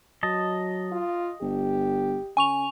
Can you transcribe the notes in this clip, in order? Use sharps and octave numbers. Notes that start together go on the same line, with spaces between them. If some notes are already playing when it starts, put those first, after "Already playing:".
F#3 D#5 A5
F4
G1 G4
C#3 G#5 C#6 F7